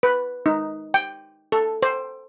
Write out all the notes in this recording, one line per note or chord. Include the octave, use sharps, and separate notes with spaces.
B4
D#4
G5
A4
C5